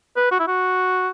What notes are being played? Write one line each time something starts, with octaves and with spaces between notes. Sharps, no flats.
B4
F#4
E4
F#4